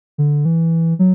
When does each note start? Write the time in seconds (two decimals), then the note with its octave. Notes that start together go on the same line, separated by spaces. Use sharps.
0.18 D3
0.45 E3
0.99 F#3